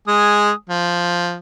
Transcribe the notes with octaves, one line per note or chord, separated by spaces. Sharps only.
G#3 G#5 D#6
F3